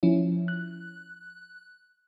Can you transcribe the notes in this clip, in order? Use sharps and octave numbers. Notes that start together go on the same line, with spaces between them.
F3 C#4 E4
F#6